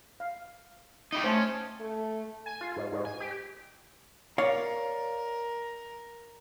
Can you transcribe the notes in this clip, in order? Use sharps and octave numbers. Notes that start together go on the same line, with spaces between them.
F5
D#4 E4 G4
A3 C#4 C5 G#5 A5
A3
G#5
F4
G#2
G#2
G#5
G4
A#4 C#5 D5 F5